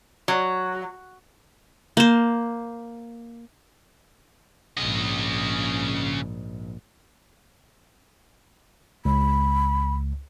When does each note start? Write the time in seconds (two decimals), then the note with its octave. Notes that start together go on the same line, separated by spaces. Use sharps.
0.28 F#3
1.97 A#3 C5
4.77 A#1 G#2 C#3 D#5
9.05 C#2 B5